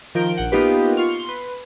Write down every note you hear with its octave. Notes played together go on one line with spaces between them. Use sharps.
D#3 F3 A#4 G6 D7
A#1 F#5
A#3 B3 D#4 F4 G4 B4
F4 C#6 F6
C6
B4